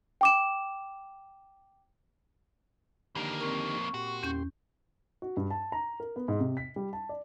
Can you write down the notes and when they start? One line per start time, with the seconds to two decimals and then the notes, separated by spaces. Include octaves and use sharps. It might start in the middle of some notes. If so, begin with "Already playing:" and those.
0.21 G5 D6 E7
3.15 F2 D3 D#3 A#3 G4
3.41 C4 A#4 C#6
3.94 A#2 F#4 G4 C6
4.23 E2 C#4 G6
5.22 F#4
5.37 G2
5.51 A5
5.72 A#5
6.00 A#4
6.16 B3
6.28 G#2
6.40 C3
6.57 B6
6.76 G3
6.93 A5
7.09 D5